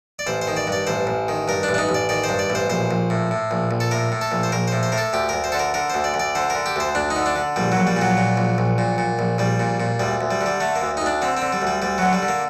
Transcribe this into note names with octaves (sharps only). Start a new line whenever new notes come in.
D5
A1 C5
C5
D#3
D5
G2 D5
A1 C5
A1
D#3
G2 A#4
D4
A1
D4
D#4
A1
D5
D#3 D5
C5
G2
D5
A1
C5
A#1 C5
A#1
A2
A2
A#1
A#1
A4
A2 A#4
A2
A4
A#1
C5
A#1 A#4
A2 C5
C5
A2 A#4
A4
D2 G4
D2 A#4
C5
D3 A4
A#4
D3 A#4
D2 C5
D5
D2
D5
D3 C5
A#4
D3
G4
D2 C5
D2 D4
D#4
D3
D4
D3
A#1 G3
F#3
A#1
G3
A#2
F#3
A#2
A#1
A#1
A#2
A#2
A#1
A#1 G3
A#2
A#2
D2 G3
D2
G3
D3
G3
D3 A3
A#3
D2
D#4
D2 D4
D3 C4
C4
D3
G3
D2
G3
D2 G3
D3 F#3
G3
D3
A#3